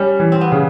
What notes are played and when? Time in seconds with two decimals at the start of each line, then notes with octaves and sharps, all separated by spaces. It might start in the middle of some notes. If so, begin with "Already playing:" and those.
Already playing: G3 C#4
0.20 E3
0.32 C4
0.41 B3
0.52 C#3